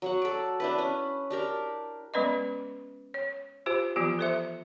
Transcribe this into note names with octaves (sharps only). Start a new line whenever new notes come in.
F#3 C#5 F#5
A4 D5
D4 E4 B4
C#4
D4 G4 A#4
G#3 B3 C#4 B4 D5 D#5
C#5
F4 G4 C5
E3 F3 B3 F4 G4
A4 C5 E5